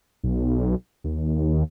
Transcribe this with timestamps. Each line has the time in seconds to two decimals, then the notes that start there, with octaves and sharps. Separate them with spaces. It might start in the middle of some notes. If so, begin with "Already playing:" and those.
0.24 B1
1.04 D#2